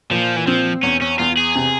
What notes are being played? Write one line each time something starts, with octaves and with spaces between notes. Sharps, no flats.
A#2 F3
E3
F3 C4
E2 C#4
C#4
E2 F4
G#4
C3